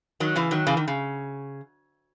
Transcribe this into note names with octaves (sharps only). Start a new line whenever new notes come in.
D#3 F#3
C#3 E3
D#3 F#3
C#3 E3
D#3
C#3